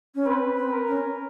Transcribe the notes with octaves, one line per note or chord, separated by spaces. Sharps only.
C#4
C4 B4
C4
A#4
C#4